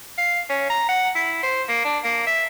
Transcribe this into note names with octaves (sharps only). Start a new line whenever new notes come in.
F5
C#4
A#5
F#5
E4
C5
A#3
D4
A#3
E5